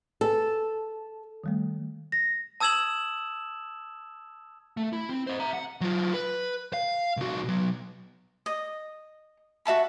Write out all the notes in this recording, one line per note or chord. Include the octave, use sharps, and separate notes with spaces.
A4 B4 G#5
D#3 G3 A3
A#6
A5 D#6 E6 G#6 E7 F#7
A3
E4
C4
C5 D#5
E5 A#5
F#5
F#3 F4
B4
F5
C2 F#4
B2 F#3
D#5
F#4 E5 A5 B5